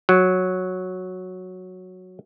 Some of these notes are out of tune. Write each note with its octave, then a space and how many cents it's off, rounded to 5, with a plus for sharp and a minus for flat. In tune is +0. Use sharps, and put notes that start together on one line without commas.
F#3 -5